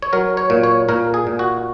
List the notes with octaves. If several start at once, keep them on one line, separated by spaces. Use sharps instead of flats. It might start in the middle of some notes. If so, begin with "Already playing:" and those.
C#5
F#3 A#4
C#5
A#2
C#5
A#2 A#4
G#4
A#2
F#4